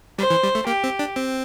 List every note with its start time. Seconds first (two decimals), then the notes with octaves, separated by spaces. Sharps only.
0.18 G3 C5
0.30 E3
0.43 G3
0.55 A3
0.67 A#3 G4
0.84 C4
0.99 D4
1.16 C4